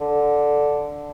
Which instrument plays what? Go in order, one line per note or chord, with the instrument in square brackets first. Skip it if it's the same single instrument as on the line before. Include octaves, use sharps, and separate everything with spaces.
[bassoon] D3